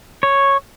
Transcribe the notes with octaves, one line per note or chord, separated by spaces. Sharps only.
C#5